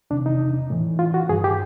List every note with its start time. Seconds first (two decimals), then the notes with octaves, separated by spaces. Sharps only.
0.10 E2 C3 D#3 D4
0.26 D#4
0.70 A2 E3
0.99 F4
1.14 F#4
1.29 G2 G#4
1.33 D#3
1.44 G4